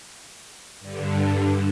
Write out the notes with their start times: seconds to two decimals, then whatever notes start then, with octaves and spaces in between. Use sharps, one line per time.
0.80 G2 D3